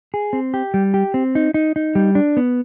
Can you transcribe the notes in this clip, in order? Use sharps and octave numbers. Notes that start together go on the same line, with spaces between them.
G#4
C4
G4
G3
G4
C4
D#4
D#4
D#4
G3
D4
B3